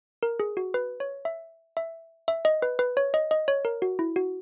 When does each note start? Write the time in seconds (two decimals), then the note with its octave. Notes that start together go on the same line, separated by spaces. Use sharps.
0.23 A#4
0.40 G#4
0.57 F#4
0.74 B4
1.00 C#5
1.25 E5
1.77 E5
2.28 E5
2.45 D#5
2.62 B4
2.79 B4
2.97 C#5
3.14 D#5
3.31 D#5
3.48 C#5
3.65 A#4
3.82 F#4
3.99 E4
4.16 F#4